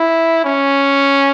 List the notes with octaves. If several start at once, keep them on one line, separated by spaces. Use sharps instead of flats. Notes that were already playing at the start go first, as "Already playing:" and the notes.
Already playing: E4
C#4